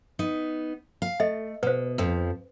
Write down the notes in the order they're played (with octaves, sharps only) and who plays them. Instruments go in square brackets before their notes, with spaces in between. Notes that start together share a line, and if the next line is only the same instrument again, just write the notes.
[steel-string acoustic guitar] B3 D#4
F5
[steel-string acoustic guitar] A3 [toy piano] A4 D#5 E5
[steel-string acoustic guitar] B2 [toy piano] B4 C5
[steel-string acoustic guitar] F2 F3